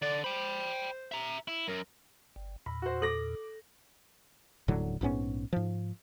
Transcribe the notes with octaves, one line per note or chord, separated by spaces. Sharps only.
D3 D5
C5 G5 B5
E5 A#5
E4
F#2 A#4
G1
E2 A#2 B5
F#4 C5
A4 D6 A#6 F#7
D#1 A2 D3 F#3
A#1 G#2 B3 C#4
G#2 F3